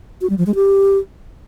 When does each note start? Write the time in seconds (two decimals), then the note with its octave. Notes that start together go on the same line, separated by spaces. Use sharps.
0.21 F#4
0.30 G3
0.38 F3
0.46 G#3
0.55 G4